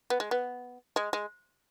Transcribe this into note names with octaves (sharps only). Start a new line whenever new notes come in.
B3
G#3
B3
G#3
G#3